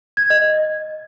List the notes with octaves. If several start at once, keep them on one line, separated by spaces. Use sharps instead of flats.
G#6
D#5